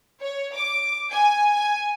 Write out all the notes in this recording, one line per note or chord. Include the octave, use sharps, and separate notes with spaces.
C#5
D6
G#5
G#5